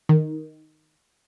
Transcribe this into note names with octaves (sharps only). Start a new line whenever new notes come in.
D#3